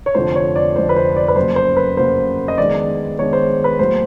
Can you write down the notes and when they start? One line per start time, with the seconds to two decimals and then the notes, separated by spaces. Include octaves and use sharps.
0.06 C#5
0.15 F1 F2 D3 F3 C5
0.35 C#5
0.56 D5
0.76 F1 F2 D3 F3 C5
0.89 B4
0.96 C5
1.17 D5
1.28 B4
1.36 F#2 C#3 F#3 A#3 C5
1.56 C5
1.76 B4
1.97 F#2 C#3 F#3 A#3 C5
2.48 D#5
2.58 D#3 G#3 B3 D4 D5
3.19 D#3 G#3 B3 D4 C#5
3.33 C5
3.64 B4
3.79 A2 F#3 A#3 C5